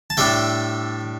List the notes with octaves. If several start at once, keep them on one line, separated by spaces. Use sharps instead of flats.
A5
A2 G3 D4 E5 G5